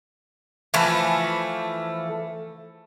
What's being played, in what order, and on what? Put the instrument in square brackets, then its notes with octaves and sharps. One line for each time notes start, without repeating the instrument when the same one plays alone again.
[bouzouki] E3 F3 A3 B4